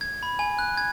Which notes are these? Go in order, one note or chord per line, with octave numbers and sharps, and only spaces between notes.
G#6
B5
G#5
F#6
G#6